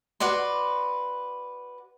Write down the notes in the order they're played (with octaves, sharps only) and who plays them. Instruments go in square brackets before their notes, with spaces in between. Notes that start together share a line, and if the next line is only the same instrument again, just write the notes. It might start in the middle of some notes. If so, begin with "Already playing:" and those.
[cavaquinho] F#4 B4 D5 C6